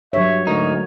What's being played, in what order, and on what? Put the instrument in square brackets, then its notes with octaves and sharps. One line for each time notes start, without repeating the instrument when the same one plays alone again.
[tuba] G2 [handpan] F#3 C#5 [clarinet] E5
[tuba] D2 [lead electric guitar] G#2 D#4 [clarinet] A#4